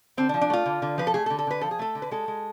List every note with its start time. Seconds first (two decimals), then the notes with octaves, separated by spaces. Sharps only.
0.17 D3 C4
0.29 D4
0.34 F3
0.41 D4
0.50 A3 F4
0.66 D3
0.82 D3
0.98 F3 B4
1.07 A4
1.14 A3 G#4
1.26 A4
1.30 D3
1.39 A4
1.47 D3 B4
1.61 F3 A4
1.71 G#4
1.79 A3 A4
1.95 D3
2.02 B4
2.11 G#3 A4
2.28 G#3